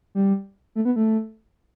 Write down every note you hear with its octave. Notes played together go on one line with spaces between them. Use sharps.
G3
A3
B3
A3